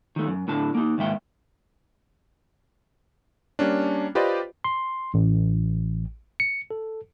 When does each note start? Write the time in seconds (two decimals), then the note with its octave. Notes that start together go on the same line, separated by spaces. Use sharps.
0.16 D#3 A3
0.28 F#2
0.48 A2 D3 A5
0.75 A#3 D#4
0.98 D#2 G#2 E5 G5
3.59 G3 A#3 C#4 D4
4.15 F4 G4 B4 C5 D5 D#5
4.64 C6
5.14 A1
6.40 C#7
6.71 A4